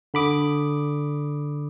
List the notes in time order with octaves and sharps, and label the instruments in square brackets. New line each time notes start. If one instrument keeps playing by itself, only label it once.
[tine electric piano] D3 B5 D6 D#6